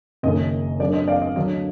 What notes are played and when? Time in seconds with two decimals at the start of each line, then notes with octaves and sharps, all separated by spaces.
0.23 F#1 F#2 D#3 D#5
0.79 F#2 D3 F#3 A#3 D5
0.93 D#5
1.08 D5 F5
1.22 D#5
1.36 D2 D3 F#3 D4 D#5